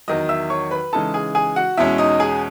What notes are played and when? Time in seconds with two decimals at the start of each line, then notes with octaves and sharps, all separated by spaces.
0.08 E2 D#3 F#3 D#5 D#6
0.29 E5 E6
0.50 C#5 C#6
0.71 B4 B5
0.93 C#3 E3 G#3 D#4 A4 A5
1.14 G#4 G#5
1.35 G#4 G#5
1.56 F#4 F#5
1.77 E2 B2 G#3 C#4 E4 E5
1.98 D#4 D#5
2.20 G#4 G#5